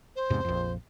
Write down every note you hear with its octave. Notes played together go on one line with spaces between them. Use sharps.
C5
E2 G#2 C3
A#1 F2